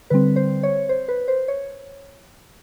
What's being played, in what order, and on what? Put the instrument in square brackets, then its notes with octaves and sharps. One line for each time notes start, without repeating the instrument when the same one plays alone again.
[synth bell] D3 G3 C4 B4
C5
C#5
C5
B4
C5
C#5